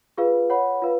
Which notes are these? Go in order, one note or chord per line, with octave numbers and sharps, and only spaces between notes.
F4 G#4 B4 F5
C#5 F#5 B5
F4 B4 F5